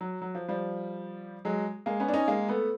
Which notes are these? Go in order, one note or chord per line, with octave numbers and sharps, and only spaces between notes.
F#3
F#3
F3
F3 G3
F#3 G#3
G#3 A#3
B3 C#4
D4
C#4 D#4
G#3 A#3
A3 B3